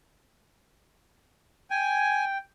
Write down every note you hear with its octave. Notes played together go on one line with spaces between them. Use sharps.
G5 G#5